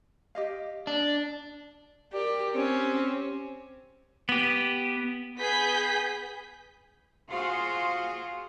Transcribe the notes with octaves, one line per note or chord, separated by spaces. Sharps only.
G4 D#5 F5
D4
G4 A#4 D5
C4 C#4 G4
B3 G4
B3 G#4 B4 G6 B6
F4 F#4 G#4 C5 F5